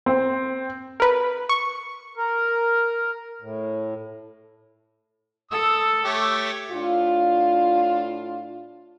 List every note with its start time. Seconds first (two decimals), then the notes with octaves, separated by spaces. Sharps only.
0.06 C4
1.00 A#4 B4
1.49 C#6
2.17 A#4
3.42 A2
5.51 A4 D#6 E6
6.05 A3 G4 C#5
6.72 A2 D4 F4